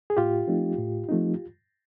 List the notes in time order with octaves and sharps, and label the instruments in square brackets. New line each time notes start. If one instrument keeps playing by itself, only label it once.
[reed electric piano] G#4
A2 F4 G4
F3 A3 C4 D#4
A2
F3 A3 C4 D#4